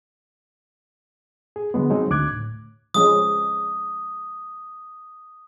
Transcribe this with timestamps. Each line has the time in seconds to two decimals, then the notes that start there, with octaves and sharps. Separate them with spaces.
1.56 G#4
1.74 D3 F#3 G#3 B3
1.90 F#3 G#3 C4 D#4
2.11 D2 D6 F#6 G#6
2.32 A2
2.94 F3 G#3 C#4 D#6